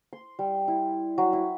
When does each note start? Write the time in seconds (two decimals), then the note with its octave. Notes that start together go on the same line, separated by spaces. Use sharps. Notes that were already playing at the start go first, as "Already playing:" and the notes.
0.13 C6
0.39 G3
0.68 E4
1.18 F#3
1.33 E4